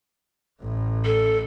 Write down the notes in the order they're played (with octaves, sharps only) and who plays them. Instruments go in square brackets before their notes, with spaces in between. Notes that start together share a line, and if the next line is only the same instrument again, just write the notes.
[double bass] A1 A2
[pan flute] A4